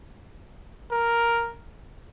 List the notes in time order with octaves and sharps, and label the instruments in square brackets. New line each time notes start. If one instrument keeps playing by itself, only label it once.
[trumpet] A#4